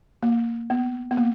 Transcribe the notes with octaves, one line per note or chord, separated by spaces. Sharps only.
A#3
B3
B3
A#3